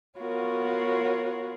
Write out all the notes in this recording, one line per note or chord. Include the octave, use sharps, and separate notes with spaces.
B3 F4 F#4 A#4 C#5